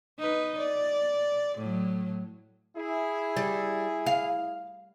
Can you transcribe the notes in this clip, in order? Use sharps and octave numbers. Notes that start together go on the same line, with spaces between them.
D#4 B4
D5
A2 F#3
E4 G#4
G3
F5